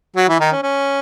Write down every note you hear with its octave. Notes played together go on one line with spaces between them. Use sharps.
F#3 F#4
E3 E4
D#3 D#4
C#4
C#4